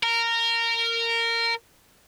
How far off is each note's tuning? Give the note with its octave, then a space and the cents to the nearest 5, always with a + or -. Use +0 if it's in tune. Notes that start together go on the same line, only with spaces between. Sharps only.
A#4 -15